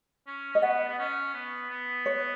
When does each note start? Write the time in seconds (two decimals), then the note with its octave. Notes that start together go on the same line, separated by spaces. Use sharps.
0.27 C#4
0.53 C#4 D#5
0.62 B3 F#5
0.88 B3
0.98 C#4
1.34 B3
1.70 B3
2.06 C#5